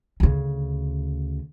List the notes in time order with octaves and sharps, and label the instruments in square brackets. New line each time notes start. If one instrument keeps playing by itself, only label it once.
[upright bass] D2 C#3